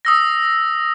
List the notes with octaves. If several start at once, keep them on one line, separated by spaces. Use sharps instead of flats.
D#6 E6 A#6